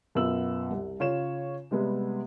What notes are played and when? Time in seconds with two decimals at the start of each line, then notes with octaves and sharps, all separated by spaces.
0.15 F#2 B2 B3 F4 E6 F#7
0.71 C2
0.99 C#3 F4 C#5 E7
1.71 C3 G3 G#3 B3